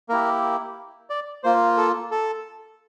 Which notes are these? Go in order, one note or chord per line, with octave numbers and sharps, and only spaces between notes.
A#3 E4 G4 A#4
D5
A#3 F4 C5
A4
A4